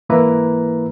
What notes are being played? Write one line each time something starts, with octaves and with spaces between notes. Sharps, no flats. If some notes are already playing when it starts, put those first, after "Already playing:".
G#2 E3 A#3 E4 B4 A#5